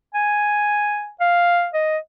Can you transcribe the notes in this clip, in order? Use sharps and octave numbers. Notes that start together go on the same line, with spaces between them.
G#5
F5
D#5